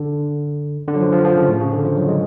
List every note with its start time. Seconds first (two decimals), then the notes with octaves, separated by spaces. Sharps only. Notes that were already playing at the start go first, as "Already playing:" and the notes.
Already playing: D3
0.88 D3
0.95 F#3
1.00 F3
1.12 F3
1.24 F3
1.36 C#3
1.48 A2
1.60 C#3
1.73 D3
1.85 F3
1.97 F#3
2.08 G#3